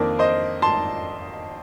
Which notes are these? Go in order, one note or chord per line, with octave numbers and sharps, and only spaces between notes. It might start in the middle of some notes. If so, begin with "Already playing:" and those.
Already playing: F2 D#3 A#3 D4 A#4 D5
C5 D#5
A5 C6